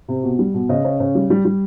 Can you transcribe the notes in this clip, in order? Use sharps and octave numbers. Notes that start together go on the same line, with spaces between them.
C3
B2
G3
B2
C#3 D#5
C#3
C#3
G3
G3
G3